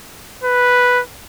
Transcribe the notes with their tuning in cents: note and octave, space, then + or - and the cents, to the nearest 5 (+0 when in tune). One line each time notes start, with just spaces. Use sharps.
B4 -5